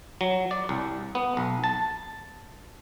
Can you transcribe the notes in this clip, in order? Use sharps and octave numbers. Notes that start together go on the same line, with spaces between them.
F#3
D5
C2
B3
B1
A5